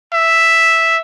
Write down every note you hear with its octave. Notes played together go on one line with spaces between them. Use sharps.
E5